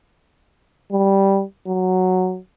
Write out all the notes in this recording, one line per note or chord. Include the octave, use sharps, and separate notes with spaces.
G3
F#3